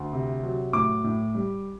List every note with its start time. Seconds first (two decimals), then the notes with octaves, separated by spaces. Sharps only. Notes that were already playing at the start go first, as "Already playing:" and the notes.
Already playing: D2
0.13 C3
0.43 F#3
0.73 A2 D6
1.04 A2
1.35 G3